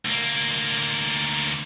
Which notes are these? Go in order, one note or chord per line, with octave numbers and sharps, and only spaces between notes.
D2 A#3